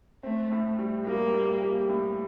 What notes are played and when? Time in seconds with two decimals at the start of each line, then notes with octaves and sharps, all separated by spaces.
0.23 A3 C4
0.52 A2
0.79 G3
1.07 G3 A#3
1.34 G3
1.62 G4
1.90 A2